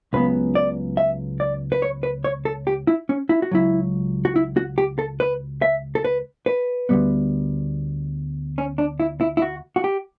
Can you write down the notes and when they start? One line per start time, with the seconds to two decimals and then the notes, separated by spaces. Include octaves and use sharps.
0.13 C#2 C#3 F#3 B3 B4
0.55 D5
0.97 E5
1.40 D5
1.72 B4
1.82 C#5
2.03 B4
2.24 C#5
2.45 A4
2.67 G4
2.87 E4
3.09 C#4
3.29 E4
3.42 F#4
3.51 C#2 B2 F#3 E4
4.25 F#4
4.36 E4
4.57 F#4
4.78 G4
4.99 A4
5.20 B4
5.62 E5
5.95 A4
6.05 B4
6.46 B4
6.89 D2 C#3 G3 B3
8.58 C#4
8.78 D4
9.00 E4
9.21 E4
9.37 E4
9.42 F#4
9.76 F#4
9.84 G4